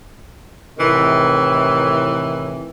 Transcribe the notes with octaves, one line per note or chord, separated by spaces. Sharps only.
A2 C3 D#3 E3